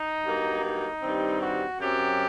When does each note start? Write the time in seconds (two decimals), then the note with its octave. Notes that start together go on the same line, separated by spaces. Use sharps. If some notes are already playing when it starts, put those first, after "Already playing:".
Already playing: D#4
0.24 G2 F#3 A#3
0.62 D#4
1.02 G2 D#3 G3 C4
1.40 F#4
1.79 F#2 F#3 C4 G4